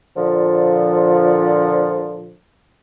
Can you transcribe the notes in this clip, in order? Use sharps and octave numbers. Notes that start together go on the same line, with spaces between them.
A#2 D3 F3